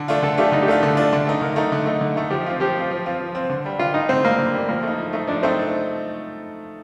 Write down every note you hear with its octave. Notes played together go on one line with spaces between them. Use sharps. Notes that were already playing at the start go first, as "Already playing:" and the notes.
Already playing: D3 A4
A3 D4 F4
D3 A4
A3 D4 F4 G4
D3 D#4
G4
A3 D4 F4 A4
D3 A4
A3 D4 F4
D3
A3 D#4
D3 A#4
A3 D#4
D3
A3 D#4
D3
A3 D#4
F3 G4
C4 F4
F3 G4
C4 F4
F3
C4 F4
F3
C4 F4
D3
G3 D4
D3 F4
G3 D4 D#4
D3 C4
G3 A#3 D4
D3
G3 D4
F3 A#3
A3 D#4
F3
A3 D#4
F3 D4
A3 C4 D#4